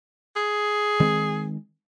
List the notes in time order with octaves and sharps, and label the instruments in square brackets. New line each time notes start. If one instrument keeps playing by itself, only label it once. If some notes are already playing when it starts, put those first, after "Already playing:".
[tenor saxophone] G#4
[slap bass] D#3 G#3 C4